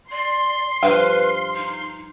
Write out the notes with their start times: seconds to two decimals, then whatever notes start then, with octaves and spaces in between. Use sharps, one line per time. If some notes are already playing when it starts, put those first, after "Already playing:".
0.11 D5 C6
0.83 G2 F3 B4 F5
1.55 D#4